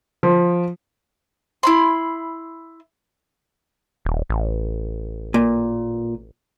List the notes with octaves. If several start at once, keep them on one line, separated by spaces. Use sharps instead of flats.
F3
E4 B5 C6
D#1
A1
A#2